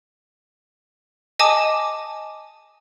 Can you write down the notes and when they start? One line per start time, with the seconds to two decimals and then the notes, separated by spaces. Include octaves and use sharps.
1.39 D#5 G#5 A5 D6 D#6